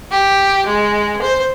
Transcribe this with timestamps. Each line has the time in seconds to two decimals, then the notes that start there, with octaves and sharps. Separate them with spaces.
0.11 G4
0.66 G#3
1.22 C5